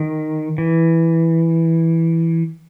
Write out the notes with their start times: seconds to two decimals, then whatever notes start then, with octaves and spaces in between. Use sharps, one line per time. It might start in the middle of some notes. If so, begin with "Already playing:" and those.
Already playing: D#3
0.58 E3